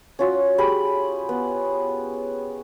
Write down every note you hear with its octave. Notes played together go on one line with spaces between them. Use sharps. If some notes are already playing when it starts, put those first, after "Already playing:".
C#4 F4 F#4
G4 G#4 B5
B3